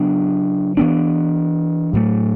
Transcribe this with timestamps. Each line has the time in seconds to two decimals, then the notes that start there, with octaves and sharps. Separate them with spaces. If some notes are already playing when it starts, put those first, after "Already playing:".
Already playing: C#3 F#3 B3 D4
0.77 E3 B3 D4
1.93 A2 F#3 A3